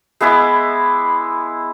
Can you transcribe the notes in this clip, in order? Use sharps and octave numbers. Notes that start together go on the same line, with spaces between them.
G#3 B3 E4 D6